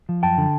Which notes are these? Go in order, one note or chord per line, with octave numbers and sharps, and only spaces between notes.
F3
F#2 G5 A5
D3